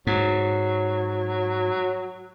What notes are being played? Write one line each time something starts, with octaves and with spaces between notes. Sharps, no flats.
G#2 F#3